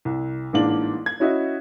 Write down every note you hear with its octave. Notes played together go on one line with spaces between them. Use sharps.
C2
A1 G#2 A#3 D4 F#7
G#6
C#4 E4 F#4 D#5 E5